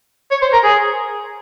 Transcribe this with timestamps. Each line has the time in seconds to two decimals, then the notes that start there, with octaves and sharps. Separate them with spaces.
0.31 C#5
0.42 C5
0.53 A#4
0.64 G#4